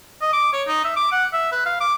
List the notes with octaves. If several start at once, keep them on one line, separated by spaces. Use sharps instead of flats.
D#5
D6
C#5
D#4
E5
D6
F#5
E5
B4
F5
D6